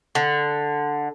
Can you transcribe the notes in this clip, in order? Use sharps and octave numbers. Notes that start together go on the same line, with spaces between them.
D3